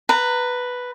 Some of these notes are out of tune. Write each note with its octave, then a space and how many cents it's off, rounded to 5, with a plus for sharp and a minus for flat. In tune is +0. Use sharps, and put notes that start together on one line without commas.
B4 +0 A#5 -25